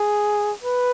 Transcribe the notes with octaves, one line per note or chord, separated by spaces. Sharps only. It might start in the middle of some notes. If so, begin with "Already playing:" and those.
Already playing: G#4
B4